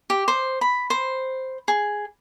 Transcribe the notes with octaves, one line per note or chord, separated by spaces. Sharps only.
G4
C5
B5
C5
G#4